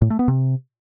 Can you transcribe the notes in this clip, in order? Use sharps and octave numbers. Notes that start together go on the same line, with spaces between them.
A2
A3
B3
C3